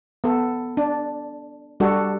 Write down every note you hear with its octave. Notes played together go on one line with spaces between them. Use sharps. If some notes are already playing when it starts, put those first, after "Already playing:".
B3 A4
D4
G3 D4 F#4 A4